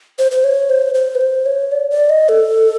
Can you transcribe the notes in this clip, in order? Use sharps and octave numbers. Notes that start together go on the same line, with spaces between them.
C5
C5
C#5
C5
C5
B4
C5
C#5
D5
D5
D#5
A4